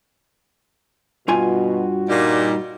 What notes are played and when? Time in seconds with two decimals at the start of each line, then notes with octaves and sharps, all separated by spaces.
1.28 G2 B2 F4 F#4 G#5
2.08 A#2 G3 D#4